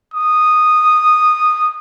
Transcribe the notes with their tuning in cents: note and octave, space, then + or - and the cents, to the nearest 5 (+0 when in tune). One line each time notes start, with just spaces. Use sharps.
D#6 -10